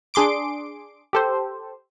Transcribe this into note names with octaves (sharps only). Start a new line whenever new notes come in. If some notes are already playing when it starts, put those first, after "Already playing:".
D4 G#4 C6 D6 D7
G4 A4 C5